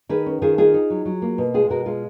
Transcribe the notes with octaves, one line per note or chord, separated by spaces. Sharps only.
D#3 G#4 B4
C#4
D#3 F4 G#4
D#4 F4 G#4
D#4
F#3
F#3
A#3
B2
G#3 F4 G#4
B2 F#4 A#4
G#3 F4